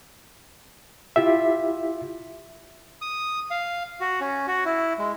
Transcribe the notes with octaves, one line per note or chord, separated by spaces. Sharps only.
E4 F4 G4 E5
D#6
F5
F#4
C#4
F#4
E4
G#3